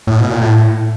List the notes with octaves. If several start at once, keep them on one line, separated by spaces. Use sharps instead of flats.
A2
B2
A#2
A2